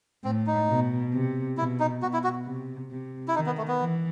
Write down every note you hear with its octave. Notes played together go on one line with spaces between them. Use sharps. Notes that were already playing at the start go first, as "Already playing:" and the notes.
A2 C4
D#4
B2
C3
B2 E4
D#4
B2 F#4
E4
F#4
C3
C3
E4
D#3 D#4
B3
A3
B3
E3